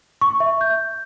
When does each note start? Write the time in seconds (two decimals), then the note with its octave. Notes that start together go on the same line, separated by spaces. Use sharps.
0.21 C#6
0.40 E5
0.61 G6